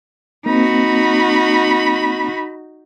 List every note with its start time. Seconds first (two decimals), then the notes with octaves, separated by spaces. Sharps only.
0.46 A#3 C4 D#4 F#4 B5